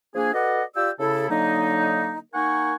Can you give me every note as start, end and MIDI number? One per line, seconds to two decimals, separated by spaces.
0.15 0.32 53
0.15 0.32 58
0.15 0.32 62
0.15 0.32 68
0.33 0.62 66
0.33 0.62 69
0.33 0.62 71
0.33 0.62 74
0.33 0.62 75
0.33 0.62 78
0.75 0.90 65
0.75 0.90 67
0.75 0.90 74
0.75 0.90 79
0.75 0.90 88
0.99 1.27 49
0.99 1.27 64
0.99 1.27 69
1.30 2.19 50
1.30 2.19 54
1.30 2.19 58
1.30 2.19 63
2.34 2.75 58
2.34 2.75 63
2.34 2.75 70
2.34 2.75 78
2.34 2.75 80
2.34 2.75 85